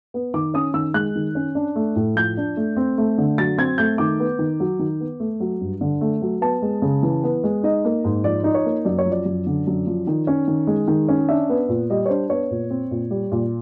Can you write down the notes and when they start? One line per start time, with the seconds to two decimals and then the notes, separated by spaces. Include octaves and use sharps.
0.14 B3
0.34 D#3 D6
0.54 C#4 D#6
0.74 D#3 E6
0.94 G#3 F#6
1.16 D#3
1.35 C#4
1.55 D4
1.76 A3
1.96 A2
2.16 F3 G6
2.37 D4
2.57 A3
2.77 C4
2.98 A3
3.18 D3
3.38 F#3 A6
3.58 C4 G#6
3.78 A3 G6
3.98 D#3 D6
4.20 B3
4.39 D#3
4.60 F#3
4.79 D#3
5.00 B3
5.20 A3
5.40 F#3
5.61 G2
5.81 D3
6.01 A3
6.22 F#3
6.41 B3 A5
6.62 G#3
6.82 C#3
7.03 E3
7.23 B3
7.44 G#3
7.63 D#4 D#5
7.85 A#3
8.04 G#2
8.24 F3 D5
8.43 D#4 D5
8.54 C#5
8.65 A#3
8.85 F#2 D5
8.98 C#5
9.06 F3
9.11 D5
9.25 F#2
9.46 D3
9.67 F#2
9.86 F3
10.07 D#3
10.27 C#4
10.48 D#3
10.67 G#3
10.88 D#3
11.09 C#4
11.29 D4 E5
11.50 B3
11.69 A#2
11.90 G3 D#5
12.06 C#5
12.09 D4 C5
12.30 B3 C#5
12.51 A#2
12.70 C4
12.91 A#2
13.11 G3
13.32 A#2